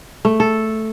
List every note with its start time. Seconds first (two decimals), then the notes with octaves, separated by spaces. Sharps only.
0.25 A3
0.40 A4